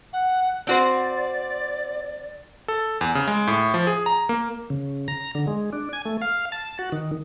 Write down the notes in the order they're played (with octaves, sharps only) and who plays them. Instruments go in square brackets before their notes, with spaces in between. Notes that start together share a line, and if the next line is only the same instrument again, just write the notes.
[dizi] F#5
[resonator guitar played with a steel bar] C4 F#4 C5 [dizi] D5
[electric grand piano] A4
E2
C#3
G#3
A2
F3
G#4
A#5
A#3
[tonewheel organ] C#3
A#5
D3
G#3
D4
G#5
A3
F5
A5
F#4
D#3